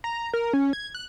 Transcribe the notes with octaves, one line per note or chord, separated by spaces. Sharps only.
A#5
A#4
C#4
G#6
F#6